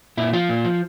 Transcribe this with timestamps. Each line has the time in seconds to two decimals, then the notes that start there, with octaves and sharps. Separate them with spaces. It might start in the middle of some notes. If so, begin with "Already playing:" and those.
0.17 A#2 E4
0.33 F3 F4
0.49 A#2
0.65 F3